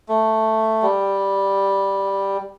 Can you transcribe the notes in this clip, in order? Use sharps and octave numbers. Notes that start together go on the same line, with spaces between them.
A3
G3